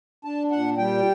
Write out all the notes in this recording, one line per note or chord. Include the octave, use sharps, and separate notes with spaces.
D4 A5
A#2 F#5
G3 G5